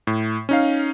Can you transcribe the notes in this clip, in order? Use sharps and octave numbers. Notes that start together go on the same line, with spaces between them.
A2
C#4 D#4 F5